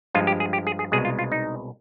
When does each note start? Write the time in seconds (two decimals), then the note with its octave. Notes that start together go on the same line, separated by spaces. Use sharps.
0.14 G2 F3 G#3 F4
0.27 G4
0.40 G#4
0.53 G4
0.67 G#4
0.79 G#4
0.92 C2 B2 G#3 G#4
1.05 F4
1.19 F4
1.32 D#4